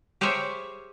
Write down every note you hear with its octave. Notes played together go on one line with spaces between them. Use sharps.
G4 G#4 A#4 C5 C#5 E5